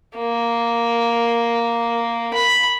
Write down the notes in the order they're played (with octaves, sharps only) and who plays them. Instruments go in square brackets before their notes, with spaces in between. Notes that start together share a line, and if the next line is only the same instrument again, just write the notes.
[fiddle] A#3
B5